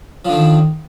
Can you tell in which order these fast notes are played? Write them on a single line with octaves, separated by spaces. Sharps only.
F3 D3 D#3